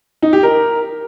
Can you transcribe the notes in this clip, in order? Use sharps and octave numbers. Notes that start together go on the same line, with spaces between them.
D#4
G4
A#4